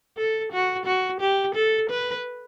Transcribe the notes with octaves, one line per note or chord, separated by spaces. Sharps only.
A4
F#4
F#4
G4
A4
B4